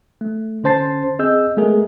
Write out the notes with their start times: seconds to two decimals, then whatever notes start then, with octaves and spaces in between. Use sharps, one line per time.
0.21 A3
0.64 D3 C#4 C5 A5 A6 C7
1.19 C4 G#4 D#5 E6 G6
1.57 G#3 A3 B3 G#4 A#4